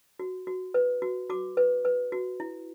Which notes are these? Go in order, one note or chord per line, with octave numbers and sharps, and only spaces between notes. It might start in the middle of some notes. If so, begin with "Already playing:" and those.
F#4
F#4
B4
F#4
F#4 D6
B4
B4
F#4
E4